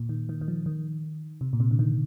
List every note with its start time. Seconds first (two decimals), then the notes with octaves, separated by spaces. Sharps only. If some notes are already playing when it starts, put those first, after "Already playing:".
Already playing: A#2
0.09 D#3
0.29 D#3
0.41 D#3
0.48 F3
0.66 D#3
1.41 C3
1.53 A#2
1.60 C3
1.71 D3
1.79 D#3